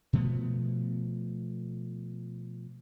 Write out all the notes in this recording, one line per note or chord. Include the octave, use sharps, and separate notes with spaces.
B2 F3 A3 B3